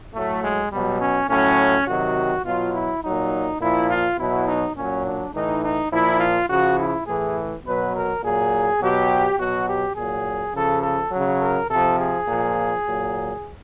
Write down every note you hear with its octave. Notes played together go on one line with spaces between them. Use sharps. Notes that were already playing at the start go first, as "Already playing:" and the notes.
A2 F#3 A3
G#3
B2 F#3 G3
C#4
A2 F#3 C#4
C3 D#3 F#3 F#4
B2 F#3 F4
E4
A#2 F#3 D#4
A#2 F3 E4
F4
B2 F#3 E4
D#4
A#2 F#3 C#4
D4
A2 E3 D#4
D#4
A#2 F3 E4
F4
C#3 F3 F#4
E4
A2 E3 G#4
B2 F#3 B4
A#4
A#2 F#3 G#4
B2 F#3 G4
B2 F#3 F#4
G4
A#2 F#3 G#4
C#3 F3 A4
A4
C#3 F#3
A#4
C3 F3 A4
G#4
A#2 F3
A#2 F#3